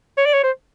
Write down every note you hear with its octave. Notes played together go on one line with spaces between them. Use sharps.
C#5
D5
C#5
C5